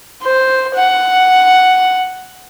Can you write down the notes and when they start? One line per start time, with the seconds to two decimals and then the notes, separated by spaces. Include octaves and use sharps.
0.23 C5
0.75 F#5